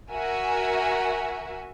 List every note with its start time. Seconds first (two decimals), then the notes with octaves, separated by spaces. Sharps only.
0.11 F#4 A#4 E5 G#5